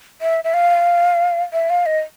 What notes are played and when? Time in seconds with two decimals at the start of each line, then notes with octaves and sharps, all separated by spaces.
0.22 E5
0.44 E5
0.54 F5
1.53 E5
1.70 F5
1.86 D#5